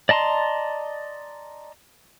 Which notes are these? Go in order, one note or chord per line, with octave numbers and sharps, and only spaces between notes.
D5 D#5 A5 A#5 C6